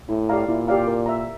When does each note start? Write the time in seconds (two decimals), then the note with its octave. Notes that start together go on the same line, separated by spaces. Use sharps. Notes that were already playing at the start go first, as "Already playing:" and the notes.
0.09 A2 E4
0.29 G4 D5 F5 A#5
0.48 A#2 E4
0.68 G4 D5 F5 A#5
0.88 A#4
1.06 E5 A#5